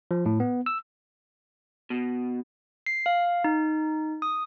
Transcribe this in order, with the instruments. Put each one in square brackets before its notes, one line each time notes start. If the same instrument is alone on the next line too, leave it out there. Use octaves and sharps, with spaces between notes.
[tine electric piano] F3
A2
B3
E6
[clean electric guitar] B2
[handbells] C7
F5
D#4
D#6